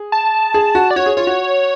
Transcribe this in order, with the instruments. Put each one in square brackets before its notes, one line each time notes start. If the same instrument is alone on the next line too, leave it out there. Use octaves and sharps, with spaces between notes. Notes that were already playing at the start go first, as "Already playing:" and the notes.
Already playing: [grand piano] G#4
[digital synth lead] A5
[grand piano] G#4
F#4
[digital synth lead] D5
[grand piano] F#4 [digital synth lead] C#5
[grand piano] G#4
[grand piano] F4 [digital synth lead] C#5
[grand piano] F#4